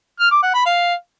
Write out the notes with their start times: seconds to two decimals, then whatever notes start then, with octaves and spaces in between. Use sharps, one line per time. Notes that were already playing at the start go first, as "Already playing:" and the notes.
0.19 F6
0.31 D6
0.42 F#5
0.54 B5
0.65 F5